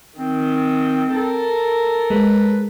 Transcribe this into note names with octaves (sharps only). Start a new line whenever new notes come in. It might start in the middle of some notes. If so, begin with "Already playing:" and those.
D#3 C4
A4 A#4
G#3 B4